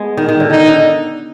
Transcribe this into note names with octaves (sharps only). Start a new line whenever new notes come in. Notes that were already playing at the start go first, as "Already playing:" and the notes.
Already playing: G#3 B3
D#3
D#3
D3
D#3 D#4
D3